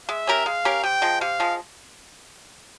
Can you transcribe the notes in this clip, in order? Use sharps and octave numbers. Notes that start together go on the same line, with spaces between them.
G#3 E5
C#4 G4 A#4
G#3 F5
C#4 G4 A#4
C3 G5
F3 G#3
C3 F5
F3 G#3